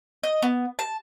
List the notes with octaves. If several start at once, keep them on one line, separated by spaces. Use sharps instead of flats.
D#5
B3
A5